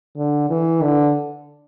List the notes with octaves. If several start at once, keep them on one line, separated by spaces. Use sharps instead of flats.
D3
E3
D3